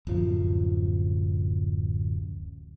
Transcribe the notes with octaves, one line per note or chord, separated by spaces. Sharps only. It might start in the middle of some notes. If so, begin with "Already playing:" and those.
D1 F#2 F3